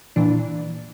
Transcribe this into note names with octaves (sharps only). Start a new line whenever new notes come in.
A#2 E3 D4